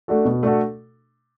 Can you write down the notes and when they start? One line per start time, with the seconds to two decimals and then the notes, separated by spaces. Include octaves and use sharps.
0.08 A3 D4 F#4 A4
0.25 B2
0.43 A3 D4 F#4 A4